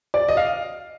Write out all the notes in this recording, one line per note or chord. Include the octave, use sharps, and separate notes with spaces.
D5
D#5
F5